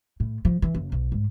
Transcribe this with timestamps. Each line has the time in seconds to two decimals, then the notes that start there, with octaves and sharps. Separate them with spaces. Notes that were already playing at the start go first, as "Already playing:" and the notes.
0.20 A2
0.45 F3
0.62 E3
0.75 F#1
0.92 B1
1.12 G#2